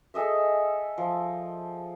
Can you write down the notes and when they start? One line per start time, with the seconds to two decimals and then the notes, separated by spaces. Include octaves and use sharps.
0.14 G#4 A4 D#5 E5
0.98 F3